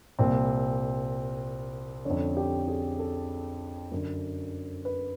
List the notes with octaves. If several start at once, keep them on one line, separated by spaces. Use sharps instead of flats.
C2 A#2 C4
F2 D3 C#4
G4
G#4
A4
F#2 D3
B4